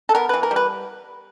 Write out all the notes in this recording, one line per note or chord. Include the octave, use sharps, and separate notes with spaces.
A4
B3 A#4
E3 B4
A#4
G3
B4